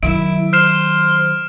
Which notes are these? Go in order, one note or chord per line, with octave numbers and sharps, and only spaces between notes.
D#3 F#3 E4 D7
C5 F6 C7 E7